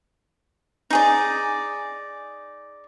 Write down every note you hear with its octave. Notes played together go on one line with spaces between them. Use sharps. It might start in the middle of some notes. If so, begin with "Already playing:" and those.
D#4 G#4 D5